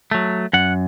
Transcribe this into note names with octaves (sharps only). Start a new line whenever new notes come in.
F#3 A3
F#2 F#5